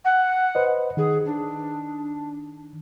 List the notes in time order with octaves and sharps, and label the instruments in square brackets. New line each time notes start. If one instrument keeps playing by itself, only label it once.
[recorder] F#5
[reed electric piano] B4 C5 D#5
[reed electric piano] D#3 [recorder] G#4
[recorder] D4